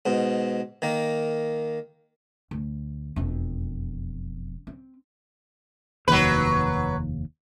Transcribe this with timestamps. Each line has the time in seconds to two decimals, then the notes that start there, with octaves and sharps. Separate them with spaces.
0.06 G#2 B2
0.82 D#3 A#3
2.51 D2
3.16 E1 F2
4.67 C4
6.08 F1 D#2 F#3 B4